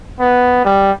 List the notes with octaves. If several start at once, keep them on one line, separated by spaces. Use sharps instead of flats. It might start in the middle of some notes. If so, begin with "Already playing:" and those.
B3
G3